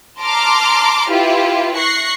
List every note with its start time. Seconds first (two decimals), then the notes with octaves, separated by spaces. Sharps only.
0.20 A5 A#5 C6 D6 F6
1.11 E4 F4 G4 B4
1.77 C#6 F#6 A#6 C7